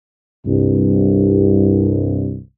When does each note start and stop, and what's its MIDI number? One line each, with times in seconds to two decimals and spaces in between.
0.46 2.38 36
0.46 2.38 43